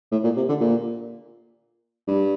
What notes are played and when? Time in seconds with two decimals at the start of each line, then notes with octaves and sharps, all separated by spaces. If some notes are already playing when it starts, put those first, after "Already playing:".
0.12 A2
0.24 A#2
0.36 C3
0.49 D3
0.60 A#2
2.08 G2